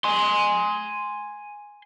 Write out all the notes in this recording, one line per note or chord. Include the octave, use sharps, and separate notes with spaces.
G#5 C6